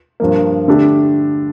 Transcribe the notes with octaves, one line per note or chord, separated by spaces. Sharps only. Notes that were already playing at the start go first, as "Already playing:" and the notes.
G2 F3 A#3
D3 A3 D4 G4